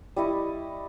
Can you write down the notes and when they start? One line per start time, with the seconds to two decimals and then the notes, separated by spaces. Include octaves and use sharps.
0.16 G3 E4 D#5 C#6